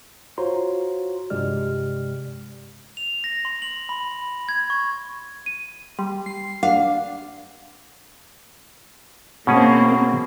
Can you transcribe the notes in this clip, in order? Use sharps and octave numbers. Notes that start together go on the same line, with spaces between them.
F4 F#4 C5 C#5 A#5 C6
G2 C3 G#3 G4 D5 F6
F7
A#6
C6
F#7
B5
G#6
C#6
D#7
G3 C6
C7
D4 F5 F#5
B2 A#3 C4 C#4 G#4